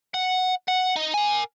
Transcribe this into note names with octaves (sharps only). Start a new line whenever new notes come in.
F#5
F#5
D#4
A#4 G#5